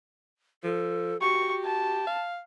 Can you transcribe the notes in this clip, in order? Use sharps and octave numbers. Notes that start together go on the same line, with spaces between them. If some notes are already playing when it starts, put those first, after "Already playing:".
F3 A4
F#4 G4 C#6
A5
F5